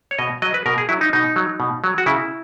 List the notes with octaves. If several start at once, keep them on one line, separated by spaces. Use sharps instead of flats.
C#5
B2 D#5
F#3 D#5
B4
B2 A#4
G#4
F#3 E4
D#4
B2 D#4
F#3
B2
F#3
F#4
C#3 E4